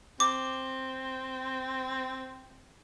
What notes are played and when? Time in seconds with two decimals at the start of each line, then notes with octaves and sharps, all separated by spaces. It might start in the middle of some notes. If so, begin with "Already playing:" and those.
0.20 C4 D6